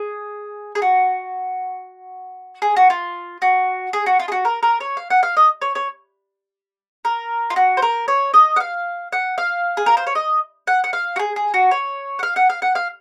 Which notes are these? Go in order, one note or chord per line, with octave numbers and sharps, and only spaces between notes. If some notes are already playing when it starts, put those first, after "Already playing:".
Already playing: G#4
G#4
F#4
G#4
F#4
F4
F#4
G#4
F#4
F4
G#4
F#4
A#4
A#4
C#5
F5
F#5
F5
D#5
C#5
C#5
A#4
F4
F#4
C5
A#4
C#5
D#5
F#5
F5
F#5
F5
G#4
A#4
C5
C#5
D#5
F#5
F#5
F5
F#4
G#4
G#4
F#4
C#5
F#5
F5
F#5
F5
F#5
F5